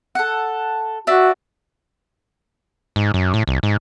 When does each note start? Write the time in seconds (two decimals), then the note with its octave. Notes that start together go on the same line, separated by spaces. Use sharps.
0.15 A4 F#5
1.07 D4 F#4 E5
2.96 G#2
3.14 F#2
3.34 A2
3.47 C2
3.63 G#2